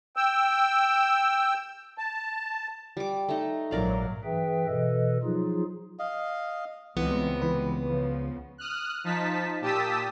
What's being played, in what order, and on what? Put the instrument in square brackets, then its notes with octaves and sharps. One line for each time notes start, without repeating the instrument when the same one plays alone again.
[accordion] G5 E6
A5
[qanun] G3 D6
A3 D#4
[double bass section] A#1 G#2 F#3 [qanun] A#4 D5 F5
[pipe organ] G2 E3 G#4 B4 E5 G5
B2 E3 A4 B4 D#5
F3 F#3 D#4 F4 G#4
[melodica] D#5 F5
[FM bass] C#2 [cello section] C3 G3 G#3 [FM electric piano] E3 [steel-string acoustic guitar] B3
[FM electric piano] E3 B4
[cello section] C#3 F3
[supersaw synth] D#6 F6 F#6
F3 D#4 A5 B6
A#2 G4 A5 D#6 E6 B6